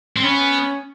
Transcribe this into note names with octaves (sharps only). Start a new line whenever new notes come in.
C4
B3 C#4